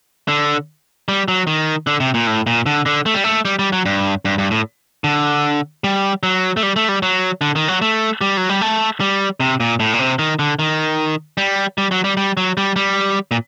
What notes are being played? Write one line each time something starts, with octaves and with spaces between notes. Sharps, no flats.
D3
G3
F#3
D#3
D3
C3
A#2
A2
A#2
D3
D3
A3
G3
A3
G3
G3
F#3
G2
G2
G2
A2
D3
G3
F#3
A3
G3
A3
G3
F#3
D3
D#3
F#3
A3
G3
F#3
G3
A3
G3
C3
A#2
A2
A#2
C3
D#3
D3
D#3
G3
G3
F#3
G3
G3
F#3
G3
G3
A#2